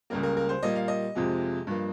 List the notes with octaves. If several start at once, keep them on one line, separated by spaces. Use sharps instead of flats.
C#2 C#3 G3 A#3 A#4
A#4
A#4
C5
A#2 G3 A#3 D#5
F5
D#5
F2 C3 F3 G#3
G2 F3 A#3